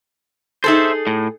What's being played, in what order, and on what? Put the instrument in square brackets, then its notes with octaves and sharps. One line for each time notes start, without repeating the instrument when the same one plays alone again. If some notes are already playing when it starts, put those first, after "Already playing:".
[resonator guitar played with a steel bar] D#4 G#4 A4 [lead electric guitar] C5 E5
[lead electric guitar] A2